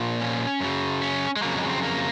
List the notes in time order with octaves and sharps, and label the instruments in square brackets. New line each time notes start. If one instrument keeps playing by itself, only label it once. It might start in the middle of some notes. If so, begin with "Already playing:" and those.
Already playing: [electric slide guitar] A#2 F3
C#4
F#2 C#3 F#3
C#4
G#3
F2 C#3 F#3 A#3
G#3
C4
A#3